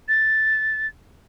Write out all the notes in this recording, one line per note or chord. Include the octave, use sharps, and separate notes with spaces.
A6